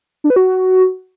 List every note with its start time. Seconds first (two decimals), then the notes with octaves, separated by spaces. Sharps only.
0.24 D4
0.30 B4
0.36 F#4